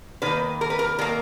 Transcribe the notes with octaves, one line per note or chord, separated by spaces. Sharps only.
D#3 A#3 B4
A#4
B4
A#4
D#3 A#3 A#4